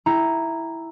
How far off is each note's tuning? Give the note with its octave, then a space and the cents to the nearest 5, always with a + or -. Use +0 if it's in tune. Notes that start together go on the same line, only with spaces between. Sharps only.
E4 +0 G5 +0 A#5 +0